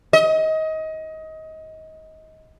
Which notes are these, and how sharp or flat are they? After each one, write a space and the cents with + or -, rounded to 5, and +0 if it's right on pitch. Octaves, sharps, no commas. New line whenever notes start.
D#5 +25